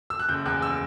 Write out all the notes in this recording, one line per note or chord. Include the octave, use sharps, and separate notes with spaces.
E6
F#6
F#1 G6
E2 F#6
E6